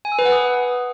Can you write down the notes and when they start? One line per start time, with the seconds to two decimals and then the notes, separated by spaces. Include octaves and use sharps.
0.05 G#5
0.12 E6
0.19 B4
0.25 F#5
0.32 D#6